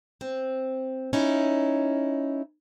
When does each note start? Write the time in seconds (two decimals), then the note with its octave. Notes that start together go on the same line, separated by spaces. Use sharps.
0.21 C4
1.13 C#4 D#4 E4